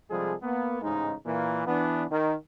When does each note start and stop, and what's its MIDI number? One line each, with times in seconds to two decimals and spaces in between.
0.11 0.34 48
0.11 0.34 53
0.11 0.34 55
0.11 0.34 56
0.11 0.34 68
0.11 0.34 69
0.42 0.79 58
0.42 0.79 59
0.82 1.14 33
0.82 1.14 44
0.82 1.14 49
0.82 1.14 56
0.82 1.14 63
1.26 1.66 46
1.26 1.66 52
1.26 1.66 58
1.67 2.05 52
1.67 2.05 59
1.67 2.05 62
2.10 2.34 51